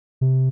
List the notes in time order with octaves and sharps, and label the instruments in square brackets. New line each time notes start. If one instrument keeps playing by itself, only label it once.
[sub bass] C3